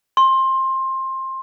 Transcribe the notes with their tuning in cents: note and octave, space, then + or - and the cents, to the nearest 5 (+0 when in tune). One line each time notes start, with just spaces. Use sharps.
C6 +20